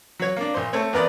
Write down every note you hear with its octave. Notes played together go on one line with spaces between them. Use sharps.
F#3 C#5
A#3 D4
A#1 C5
A3 C4 C#5
E2 B3 A#4 B4 D5